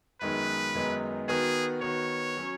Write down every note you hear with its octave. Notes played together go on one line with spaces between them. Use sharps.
F#2 D#3 G#3 B3 D#4 B4
F#2 D#3 G#3 B3 D#4
D#3 B3 F#4 G#4
D#3 B3 F#4 C#5
F#3 C#4